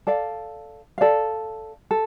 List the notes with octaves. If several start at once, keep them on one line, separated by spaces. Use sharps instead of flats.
A4 D5 F5
A4 D5 F5
A4